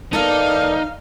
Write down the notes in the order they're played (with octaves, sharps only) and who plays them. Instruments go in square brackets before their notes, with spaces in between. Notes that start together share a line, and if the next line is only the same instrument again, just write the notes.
[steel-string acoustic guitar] E2 A#3 A4 [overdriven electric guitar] D#4 [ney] D5 [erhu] F5